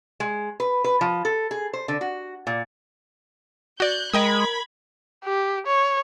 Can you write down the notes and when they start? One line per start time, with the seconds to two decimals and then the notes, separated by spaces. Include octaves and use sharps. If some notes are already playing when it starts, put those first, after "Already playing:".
0.20 G#3
0.60 B4
0.84 B4
1.01 F3
1.25 A4
1.51 G#4
1.73 C5
1.88 D3
2.01 F#4
2.47 A#2
3.80 F#4 D5 F#6 G6
4.13 G#3 A#4 D#5 G5 B5 D#6 G#6
5.25 G4
5.67 C#5